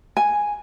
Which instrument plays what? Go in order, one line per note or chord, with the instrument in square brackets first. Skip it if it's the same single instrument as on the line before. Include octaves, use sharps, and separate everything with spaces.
[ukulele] G#5